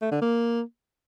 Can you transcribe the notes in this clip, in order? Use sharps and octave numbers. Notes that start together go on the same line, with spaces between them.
A3
D3
A#3